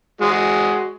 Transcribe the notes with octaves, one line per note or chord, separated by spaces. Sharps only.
G#3 F#4